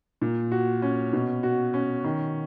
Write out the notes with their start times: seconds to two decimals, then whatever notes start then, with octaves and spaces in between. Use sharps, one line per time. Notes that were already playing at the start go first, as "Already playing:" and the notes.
0.21 A#2
0.52 F#4
0.82 C#4
1.13 B2
1.43 F#4
1.74 C#4
2.04 D#3